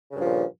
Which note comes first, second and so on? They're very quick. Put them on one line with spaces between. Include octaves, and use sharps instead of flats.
C#3 G2 F3 A#2